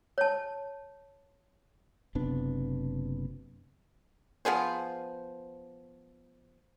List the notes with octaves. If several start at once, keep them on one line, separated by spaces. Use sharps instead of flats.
C#5 A5
F#1 C3 B3 D4
F3 B3 G#4 C5